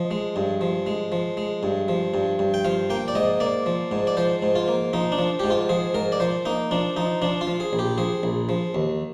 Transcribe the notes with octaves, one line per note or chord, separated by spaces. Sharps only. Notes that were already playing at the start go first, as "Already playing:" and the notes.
Already playing: F3 D#5
G#3
G2
F3
G#3
F3
G#3
G2
F3
G2
G2
G5
F3 F5
A#3 G5
D5
G#2 D#5
A#3 D5
F3
G#2
D5
F3 C5
G#2
F4
A#3
F3 D#4
D4
F3
G#2 G4
F4
F3 G#4
G#2 A#4
D5
F3 C5
A#3 D#4
F3 D4
F3 D#4
F3 D4
F4
F3
G#4
A#1
G4
F3 G#4
A#1
F3
D#2